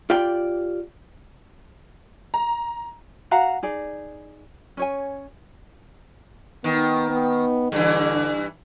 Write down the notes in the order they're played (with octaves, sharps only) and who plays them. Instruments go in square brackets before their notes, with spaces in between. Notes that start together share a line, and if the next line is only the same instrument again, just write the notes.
[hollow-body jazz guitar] F4 G4 D5 G5
[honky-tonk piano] A#5
[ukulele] F#4 F5 F#5 A#5
D#4 G#4 D5
C#4 C#5 G#5
[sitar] D#3 [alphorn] B3
[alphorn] B3
[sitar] G2 E3 [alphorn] D3